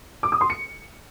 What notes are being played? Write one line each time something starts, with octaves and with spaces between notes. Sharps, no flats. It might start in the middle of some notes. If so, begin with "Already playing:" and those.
D6
D#6
C6
C#7